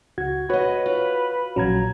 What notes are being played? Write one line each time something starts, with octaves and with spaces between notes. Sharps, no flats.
C#2 F#4 G#6
F#4 B4 C#5 D#5
F4
A#1 F#3 C#4 A#5 G#6